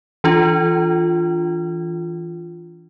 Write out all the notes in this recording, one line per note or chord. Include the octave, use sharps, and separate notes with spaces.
E3 D4 F4